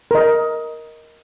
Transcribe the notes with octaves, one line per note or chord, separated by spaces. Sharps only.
A#4 D#5